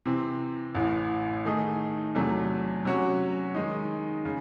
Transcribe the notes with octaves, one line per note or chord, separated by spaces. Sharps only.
C3 E3 C4
A1 A2 E3
D#3 A3 D#4 G#4
E2 C3 F#3 A3
C3 F#3 C#4 F#4 C#5
D#3 G#3 D#4
C#3